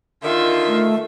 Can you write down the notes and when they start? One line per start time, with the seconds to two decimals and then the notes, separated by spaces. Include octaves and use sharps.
0.23 D3 D#3 F4 E5
0.67 A3